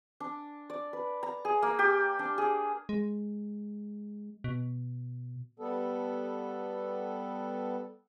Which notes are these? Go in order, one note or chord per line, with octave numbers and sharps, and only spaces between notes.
D4
D5
B4
A#5
G#4
A#3
G4
D4
G#4
G#3
B2
G3 B3 A4